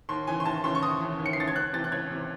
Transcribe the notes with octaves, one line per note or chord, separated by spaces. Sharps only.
D#2 C6
C#3 E3 G#5
C6
D#2 A5
C#3 E3 C6
C#6
D#2 D#6
C#3 E3
D#2
C#7
C7
C#3 E3 A6
G#6
C#2 F#6
C3 E3 A6
F#6
C#2 G#6
C3 E3